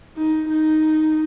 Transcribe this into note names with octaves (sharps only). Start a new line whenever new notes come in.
D#4
D#4